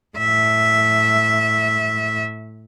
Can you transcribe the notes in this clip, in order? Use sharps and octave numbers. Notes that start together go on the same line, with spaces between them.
A2 E5